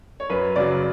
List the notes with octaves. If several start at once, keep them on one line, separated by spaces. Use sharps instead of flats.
C#5
F#2 B4
C#3 F#3 D5